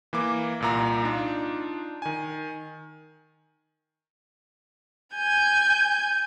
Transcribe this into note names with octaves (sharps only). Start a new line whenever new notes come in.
E3 A#3 D6
C2 A#2 A#5
D4 D#4 F4
D#3 G#5
G#5 G6 G#6